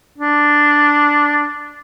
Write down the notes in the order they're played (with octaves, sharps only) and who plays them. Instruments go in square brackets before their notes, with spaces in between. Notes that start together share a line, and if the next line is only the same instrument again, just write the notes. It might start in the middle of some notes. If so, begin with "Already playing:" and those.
[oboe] D4